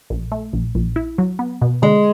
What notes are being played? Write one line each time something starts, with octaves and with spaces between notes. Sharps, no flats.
A#1
A3
A#1
A#1
E4
F#3
B3
B2
D3 G#3